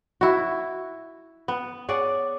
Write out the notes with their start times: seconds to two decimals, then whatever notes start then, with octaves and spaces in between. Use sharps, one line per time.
0.21 E4 F#4
1.48 B3
1.89 G#4 C#5 D5 F#5